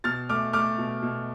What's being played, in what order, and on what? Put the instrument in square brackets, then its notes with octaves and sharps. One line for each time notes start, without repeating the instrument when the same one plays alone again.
[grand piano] B2 F6 A6
A3 D6 F6
A3 D6 F6
B2
B2